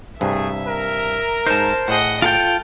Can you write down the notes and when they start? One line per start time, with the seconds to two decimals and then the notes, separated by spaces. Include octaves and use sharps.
0.21 C2 G2 A3 G#4 E5
0.67 A#4
1.47 G#2 D#4 C5 A5
1.88 A2 G#4 D#5 F#5
2.22 F4 A4 G5 D7 F7